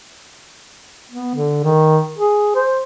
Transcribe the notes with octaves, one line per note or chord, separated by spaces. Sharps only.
B3
D3
D#3
G#4
C5